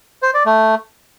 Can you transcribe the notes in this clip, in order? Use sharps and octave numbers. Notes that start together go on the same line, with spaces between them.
C5
D5
A3